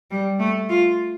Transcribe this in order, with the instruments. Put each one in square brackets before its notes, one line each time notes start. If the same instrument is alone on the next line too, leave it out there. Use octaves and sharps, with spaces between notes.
[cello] G3
A3
F4